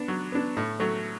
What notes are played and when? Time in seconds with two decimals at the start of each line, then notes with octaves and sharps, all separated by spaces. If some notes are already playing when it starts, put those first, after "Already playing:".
Already playing: B3 D4
0.08 F#3
0.32 B3 D4
0.57 A2
0.80 F#3 A3